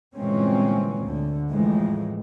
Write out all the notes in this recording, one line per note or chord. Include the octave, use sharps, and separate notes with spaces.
G1 A#2 E3 G#3 C4 C#4
D2 D3
F2 A2 E3 G#3